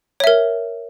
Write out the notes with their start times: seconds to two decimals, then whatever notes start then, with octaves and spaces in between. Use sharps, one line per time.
0.20 C#5
0.24 E5
0.27 A#4